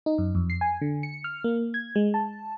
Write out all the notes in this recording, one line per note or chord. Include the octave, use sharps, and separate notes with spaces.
D#4
F#2
F2
C7
G#5
D3
C#7
F6
A#3
G#6
G#3
A5